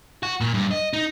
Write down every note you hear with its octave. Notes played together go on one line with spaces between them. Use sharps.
F#4
A#2
G2
D#5
D#4